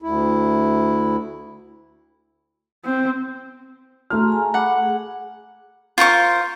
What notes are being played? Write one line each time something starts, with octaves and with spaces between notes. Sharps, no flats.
D2 E4
C4
A3 F#4 A#5 C6 F6
G#4 G#5 A#5
F#5 B5 D6
G#4
F4 A#4 C5 C#6